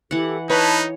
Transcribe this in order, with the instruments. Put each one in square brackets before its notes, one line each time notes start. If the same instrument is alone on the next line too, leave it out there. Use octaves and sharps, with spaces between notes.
[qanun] E3 F#5 [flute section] G4 A4
[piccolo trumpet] D#4 [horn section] B4 [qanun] C#5 [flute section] A5